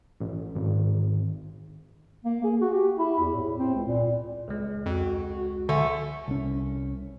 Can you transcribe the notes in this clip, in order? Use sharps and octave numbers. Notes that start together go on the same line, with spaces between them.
A1
G#1
A#3
G#4
F#4
G4
E4
E2
A2
C4
C#2
A#2
C#2 G#3
F2 F#4
D3 A3 G#5
C2 C#4